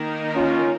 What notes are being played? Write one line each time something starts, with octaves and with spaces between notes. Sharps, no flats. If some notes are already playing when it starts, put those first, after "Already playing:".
Already playing: D#3 A#3 D#4 A#4
C#4 F4